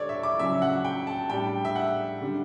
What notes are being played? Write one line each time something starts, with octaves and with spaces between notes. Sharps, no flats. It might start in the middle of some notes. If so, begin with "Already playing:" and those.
Already playing: D3 G3 D4 A4 C#5 D5
E5
D6
C#3 F#3 C#4 E5
F#5
G5
A5
A2 G3 D4 G5
E5
F#5
D3 G3 D4